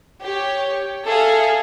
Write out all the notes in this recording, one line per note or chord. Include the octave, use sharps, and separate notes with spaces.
G4 C#5
G#4 A4 E5 F5